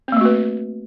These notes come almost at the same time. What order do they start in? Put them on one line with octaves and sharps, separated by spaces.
C4 A#3 A3 F#4 B4